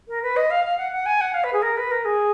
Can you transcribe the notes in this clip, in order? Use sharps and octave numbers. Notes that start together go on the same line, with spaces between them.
A#4
B4
D#5
F5
F5
F#5
F#5
G#5
F#5
F5
B4
G#4
A#4
B4
A#4
G#4